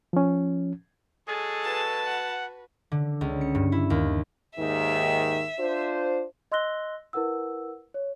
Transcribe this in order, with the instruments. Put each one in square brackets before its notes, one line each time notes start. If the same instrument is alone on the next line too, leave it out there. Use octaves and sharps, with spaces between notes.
[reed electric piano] F3 C#4
[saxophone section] F#3 G#3 A4 [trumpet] G#4
[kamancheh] F#4 B4 [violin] A5
[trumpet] F#5
[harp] D3
C#2
C#7
G2
E4
D#2
[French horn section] D#2 G#2 D#3 [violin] E5
[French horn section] D4 F4 C5
[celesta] D#5 C6 E6 F#6 A#6 G7
E4 A#4 B4 F#5 E6
C#5